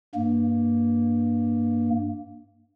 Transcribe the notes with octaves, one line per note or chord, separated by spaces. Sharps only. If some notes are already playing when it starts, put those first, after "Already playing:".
G2 A#3